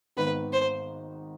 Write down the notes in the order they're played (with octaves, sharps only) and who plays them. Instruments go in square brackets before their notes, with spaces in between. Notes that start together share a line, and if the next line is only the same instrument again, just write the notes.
[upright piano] G#1 G#2 D#3 B3 D#4 [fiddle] B4
[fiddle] C5